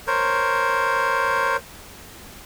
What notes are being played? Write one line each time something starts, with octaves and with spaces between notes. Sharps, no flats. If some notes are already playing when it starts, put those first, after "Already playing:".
A#4 C5 C#5